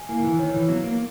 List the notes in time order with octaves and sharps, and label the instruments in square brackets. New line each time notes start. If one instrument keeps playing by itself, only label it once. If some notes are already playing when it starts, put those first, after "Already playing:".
Already playing: [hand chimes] G#5
[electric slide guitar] A#3 [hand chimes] E4
[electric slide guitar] D#3
E3
[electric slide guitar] D#3 [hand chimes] C#5
[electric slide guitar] E3
[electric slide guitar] F#3 [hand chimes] B3
[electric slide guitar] A#3